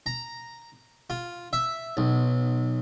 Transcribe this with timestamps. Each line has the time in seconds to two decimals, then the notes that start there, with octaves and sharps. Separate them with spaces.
0.06 A#5
1.10 F4
1.53 E5
1.97 B1